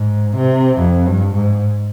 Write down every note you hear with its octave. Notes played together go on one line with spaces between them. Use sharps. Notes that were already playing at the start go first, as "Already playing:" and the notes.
Already playing: G#2
C3
F2
G2
G#2